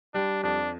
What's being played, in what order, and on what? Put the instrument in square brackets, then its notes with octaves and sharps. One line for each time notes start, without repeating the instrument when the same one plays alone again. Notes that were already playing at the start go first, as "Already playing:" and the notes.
[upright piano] G3 [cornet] D4
[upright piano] F2 [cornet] D4